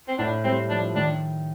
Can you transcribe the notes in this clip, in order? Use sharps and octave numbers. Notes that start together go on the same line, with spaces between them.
C4
A2 D4
G3 C4
F3 D4
D#3 D4